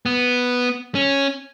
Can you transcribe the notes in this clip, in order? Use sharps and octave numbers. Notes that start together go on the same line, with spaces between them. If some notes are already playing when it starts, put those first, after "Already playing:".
B3
C#4